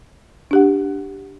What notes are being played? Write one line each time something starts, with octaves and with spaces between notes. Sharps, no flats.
D4 G4 F#5